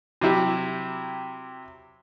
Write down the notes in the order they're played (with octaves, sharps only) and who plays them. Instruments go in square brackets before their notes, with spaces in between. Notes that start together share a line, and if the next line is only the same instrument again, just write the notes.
[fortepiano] C3 F#3 E4 G4